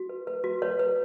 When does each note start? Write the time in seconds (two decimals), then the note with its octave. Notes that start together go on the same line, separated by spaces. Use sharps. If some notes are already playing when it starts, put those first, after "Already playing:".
Already playing: F#4
0.09 B4
0.27 B4
0.44 F#4
0.62 B4 C#5
0.79 B4